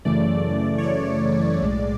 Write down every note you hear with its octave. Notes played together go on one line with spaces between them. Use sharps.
F#2 C#3 E3 A3 D5
C#5
F#2 C#3 E3 A3 D5
B1 A2 G#3